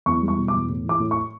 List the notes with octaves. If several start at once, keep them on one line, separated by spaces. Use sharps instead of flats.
E2 C#6
G3
C#6
B2
D6
E2
A2
E3 D6
A2
C#6